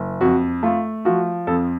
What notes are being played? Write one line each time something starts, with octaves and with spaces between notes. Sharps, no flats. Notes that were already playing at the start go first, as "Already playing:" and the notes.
Already playing: F#1
F2 F#4
A3 F4
F3 F#4
F2 A4